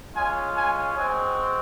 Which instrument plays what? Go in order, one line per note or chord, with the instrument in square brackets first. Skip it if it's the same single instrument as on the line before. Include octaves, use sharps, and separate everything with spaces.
[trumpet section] G#3 C#4 F4 G#5
G#5
G#3 C4 F#4 G#5